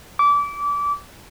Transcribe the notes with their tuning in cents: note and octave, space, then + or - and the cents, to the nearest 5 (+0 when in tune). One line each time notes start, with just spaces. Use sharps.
D6 -25